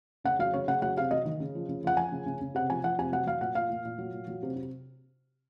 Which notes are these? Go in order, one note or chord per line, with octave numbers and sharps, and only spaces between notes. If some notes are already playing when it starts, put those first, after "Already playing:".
C#3 F#5
F#3 F5
C#3 C#5
C#3 F#5
F#3 F#5
C3 F5
F#3 D#5
D#3
C#3
F3
C#3
F3 F#5
F3 G#5
C#3
C#3
C#3
C3 F#5
F3 G#5
F3 F#5
C3 G#5
F#3 F#5
F#3 F5
A#2 F#5
A#2 F5
A#2
A#2
F#3
A#2
F#3
C3
C3